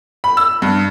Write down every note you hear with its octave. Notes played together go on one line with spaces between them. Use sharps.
B5
E6
G2